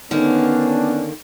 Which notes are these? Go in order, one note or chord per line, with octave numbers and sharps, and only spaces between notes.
D3 D#3 A#3 B3 C#4 D4